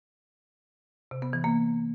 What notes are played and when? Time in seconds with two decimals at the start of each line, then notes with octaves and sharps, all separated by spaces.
1.11 C3
1.22 B3
1.33 E3
1.44 A#3